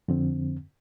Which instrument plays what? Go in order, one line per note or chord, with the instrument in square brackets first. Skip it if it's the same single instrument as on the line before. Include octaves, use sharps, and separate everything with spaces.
[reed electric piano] F2 D3 C4